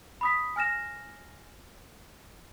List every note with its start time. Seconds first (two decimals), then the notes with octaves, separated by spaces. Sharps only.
0.21 B5 D#6 B6
0.56 G#5 F6 A#6 E7